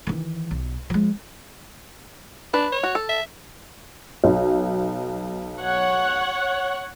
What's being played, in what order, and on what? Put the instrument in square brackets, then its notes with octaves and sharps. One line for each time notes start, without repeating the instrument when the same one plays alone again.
[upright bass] D#3 E3
B1
F3 G#3
[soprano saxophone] D4 [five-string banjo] B4
[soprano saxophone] C#5
[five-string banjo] F#4
A4
[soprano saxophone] E5
[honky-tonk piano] B1
[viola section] C#5 F#5